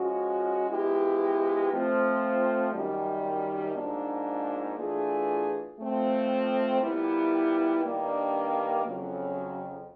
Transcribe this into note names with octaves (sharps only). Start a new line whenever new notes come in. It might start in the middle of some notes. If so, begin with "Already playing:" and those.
Already playing: F3 G#3 C#4 F#4
F3 G#3 B3 E4 G4
F3 A3 C4
F#2 D#3 G3
G#2 F3 A#3 D4
E3 A3 D4 F4 G#4
F3 A3 C4
A#2 G3 B3 E4 G4
G2 D#3 G3 A#3 D4
F2 C#3 F#3